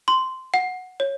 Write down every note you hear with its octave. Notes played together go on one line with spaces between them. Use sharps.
C6
F#5
C#5